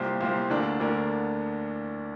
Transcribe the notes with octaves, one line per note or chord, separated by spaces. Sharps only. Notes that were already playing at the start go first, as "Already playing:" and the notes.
Already playing: C2 A#2 A#3 G4 C5
C2 A#2 A#3 G4 C5
D2 D3 A#3 D4 A#4
D2 D3 A#3 D4 A#4